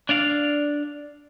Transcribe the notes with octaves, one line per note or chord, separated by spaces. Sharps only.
D4 D5 F5